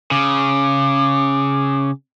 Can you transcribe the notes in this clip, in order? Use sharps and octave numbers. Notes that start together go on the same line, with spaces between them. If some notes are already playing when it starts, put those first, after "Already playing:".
C#3 D6